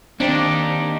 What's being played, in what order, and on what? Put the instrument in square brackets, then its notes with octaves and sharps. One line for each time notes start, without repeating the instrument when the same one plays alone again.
[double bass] D#3 [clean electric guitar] A#3 D#4 G4 [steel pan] C4 [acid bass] D4